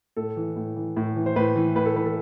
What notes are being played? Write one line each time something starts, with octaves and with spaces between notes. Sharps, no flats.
A2 A4
E3
A2
E3
A2
E3
C5
A2 B4
E3
A2 B4
A4
E3 B4
A4